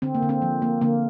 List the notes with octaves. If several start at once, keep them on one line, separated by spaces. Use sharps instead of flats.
D3 C4
A#3
D3
C4
F3
A#3
D3 A#3